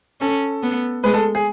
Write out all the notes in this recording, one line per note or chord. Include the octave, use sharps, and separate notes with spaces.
C#4 A4
B3
G#3 B4
A4
G#4